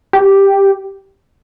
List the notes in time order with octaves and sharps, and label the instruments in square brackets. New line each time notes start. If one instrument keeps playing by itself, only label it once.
[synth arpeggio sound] G4